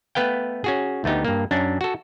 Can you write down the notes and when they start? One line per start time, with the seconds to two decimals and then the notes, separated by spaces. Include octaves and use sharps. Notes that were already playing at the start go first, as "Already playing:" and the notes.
0.15 A3 B3 B4 F5 G5
0.64 C#4 F#4 G#4
1.04 D2 A3 B3 D#4 G4
1.25 G2 A#3
1.51 F#2 C#4 D4
1.81 F#4 A4